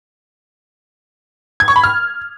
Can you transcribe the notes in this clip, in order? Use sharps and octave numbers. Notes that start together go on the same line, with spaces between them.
G#6
C#6
B5
F6